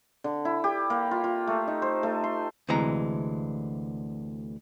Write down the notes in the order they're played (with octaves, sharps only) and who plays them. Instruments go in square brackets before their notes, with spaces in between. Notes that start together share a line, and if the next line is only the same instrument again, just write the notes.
[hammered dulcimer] D3
E4
G4
A#3
F4
F4
A3
D#4
C5
A3
C6
[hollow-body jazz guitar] D2 C3 E3 G#3 A#5